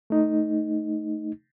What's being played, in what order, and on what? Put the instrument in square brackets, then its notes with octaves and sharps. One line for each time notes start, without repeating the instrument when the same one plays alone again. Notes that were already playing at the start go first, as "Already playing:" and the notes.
[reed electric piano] A3 D#4